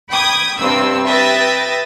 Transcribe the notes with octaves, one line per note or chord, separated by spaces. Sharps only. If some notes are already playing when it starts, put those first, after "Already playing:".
G5 B5 D#6 G#6
G2 C3 C4 E6
B4 E5 G5 D#6 A6 A#6